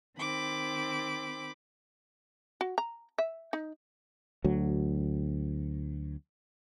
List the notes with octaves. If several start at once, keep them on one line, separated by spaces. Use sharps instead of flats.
D#3 C4 B5 D6
F#4
A#5
E5
D#4
D2 F#3